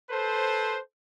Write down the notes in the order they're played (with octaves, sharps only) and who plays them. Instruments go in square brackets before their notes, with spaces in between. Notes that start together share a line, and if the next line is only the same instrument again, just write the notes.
[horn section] A4 B4 C5